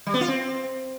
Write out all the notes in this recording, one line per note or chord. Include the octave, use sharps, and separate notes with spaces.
G3
B3
F4
C4